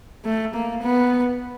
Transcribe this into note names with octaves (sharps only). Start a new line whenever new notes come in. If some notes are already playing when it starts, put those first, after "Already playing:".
A3
A#3
B3